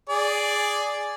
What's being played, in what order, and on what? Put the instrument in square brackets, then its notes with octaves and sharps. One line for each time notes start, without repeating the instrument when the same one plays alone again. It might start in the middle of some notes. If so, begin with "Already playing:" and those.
[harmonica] G#4 D5